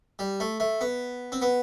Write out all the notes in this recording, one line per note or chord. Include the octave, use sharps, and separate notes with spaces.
G3
A3
A3
B3
C4
B3